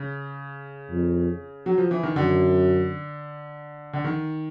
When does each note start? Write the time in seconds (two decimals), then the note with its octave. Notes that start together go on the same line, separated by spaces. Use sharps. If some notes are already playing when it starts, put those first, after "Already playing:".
Already playing: C#3
0.91 F2
1.66 F#3
1.78 F3
1.91 E3
2.03 D#3
2.16 F#2 D3
3.93 D3
4.04 D#3